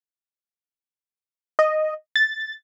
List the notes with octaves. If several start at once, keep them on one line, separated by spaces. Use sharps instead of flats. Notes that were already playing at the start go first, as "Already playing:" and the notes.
D#5
A6